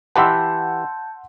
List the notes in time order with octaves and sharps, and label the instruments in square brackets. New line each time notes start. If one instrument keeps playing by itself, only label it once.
[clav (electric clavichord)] E3 G4 B4 [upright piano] F#5 C6 E6 [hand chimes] A5 G6